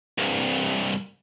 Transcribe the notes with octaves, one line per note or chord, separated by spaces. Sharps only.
C2 G2